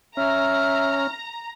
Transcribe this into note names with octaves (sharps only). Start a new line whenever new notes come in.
C#4 E5 A#5 F6